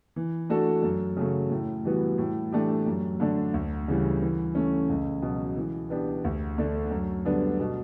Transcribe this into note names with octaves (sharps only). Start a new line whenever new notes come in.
E3
A3 D4 F#4 A4
F#2
C#3 F#3 A3
A2
E3 G3 B3 F#4
A2
E3 A3 D4 G4
F#2
D3 A3 D4
D2
C#3 E3 G3
E3
A3 C#4
C#2
B2 F#3
E3
B3 D4 G4
D2
D3 A3 D4
F#2
D3 G3 B3 D4
B2